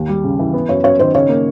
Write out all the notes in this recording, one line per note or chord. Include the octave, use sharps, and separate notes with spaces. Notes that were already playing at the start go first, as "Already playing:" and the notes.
Already playing: D#2
G3
C#3
E3
B3
F#2 C#5
F#2 C#5
D#3 C5
C#3 C#5
A#3